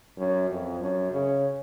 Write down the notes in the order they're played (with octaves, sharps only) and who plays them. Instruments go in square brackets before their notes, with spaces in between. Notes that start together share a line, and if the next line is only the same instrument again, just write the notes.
[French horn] F#2
F2
F#2
C#3